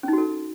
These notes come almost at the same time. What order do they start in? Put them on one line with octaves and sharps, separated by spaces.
C#4 D#4 F#4 A4